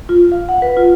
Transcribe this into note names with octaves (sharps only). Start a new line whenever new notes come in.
F4
F5
F#5
B4
F4